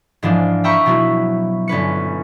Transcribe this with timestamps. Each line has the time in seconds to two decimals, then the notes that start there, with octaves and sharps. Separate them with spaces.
0.23 G#2 E3 F3 G#3 D4 F4
0.64 E5 G5 A#5 B5 C#6
0.86 B2 F#3 E4
1.68 G1 C#4 B4 C#7